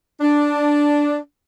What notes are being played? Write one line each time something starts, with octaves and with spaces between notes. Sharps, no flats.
D4